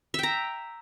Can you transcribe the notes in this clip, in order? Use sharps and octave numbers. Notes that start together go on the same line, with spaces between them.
E5 G5 A#5